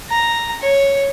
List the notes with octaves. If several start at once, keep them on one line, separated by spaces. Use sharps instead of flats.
A#5
C#5